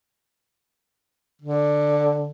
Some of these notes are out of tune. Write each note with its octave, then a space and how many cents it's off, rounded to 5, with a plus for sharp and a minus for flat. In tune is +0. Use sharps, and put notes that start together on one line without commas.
D3 +5